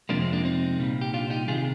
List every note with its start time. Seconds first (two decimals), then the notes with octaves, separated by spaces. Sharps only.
0.09 F2 C3 F3 G#3 A#3 D4
0.22 C4
0.33 A#3 D4
0.44 C4 D#4
0.79 C2 A#2 G3
1.01 G4
1.13 D4 F4
1.30 D#4 G4
1.48 C2 C3 D#3 F4 G#4